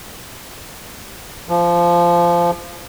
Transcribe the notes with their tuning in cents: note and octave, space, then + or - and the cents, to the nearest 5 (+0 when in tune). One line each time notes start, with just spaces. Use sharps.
F3 -15